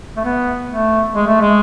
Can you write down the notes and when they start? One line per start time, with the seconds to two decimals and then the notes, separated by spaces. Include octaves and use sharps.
0.17 A3
0.25 B3
0.69 A3
1.15 G#3
1.28 A3
1.41 G#3